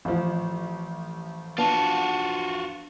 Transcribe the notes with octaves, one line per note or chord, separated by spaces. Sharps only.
A1 F3
B3 D4 F4 F#4